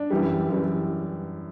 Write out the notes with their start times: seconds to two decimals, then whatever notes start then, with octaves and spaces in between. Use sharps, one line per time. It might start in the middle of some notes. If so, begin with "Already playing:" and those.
Already playing: D4
0.10 F#2 E3 G3
0.49 F#2 E3 G3